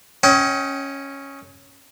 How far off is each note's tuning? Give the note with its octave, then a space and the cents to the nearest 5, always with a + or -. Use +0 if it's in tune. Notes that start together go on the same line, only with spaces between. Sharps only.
C#4 -5 D#5 +35 G5 -30